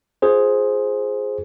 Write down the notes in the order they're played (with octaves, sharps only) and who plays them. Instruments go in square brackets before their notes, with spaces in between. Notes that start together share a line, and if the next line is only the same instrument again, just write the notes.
[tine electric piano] F4 G#4 C5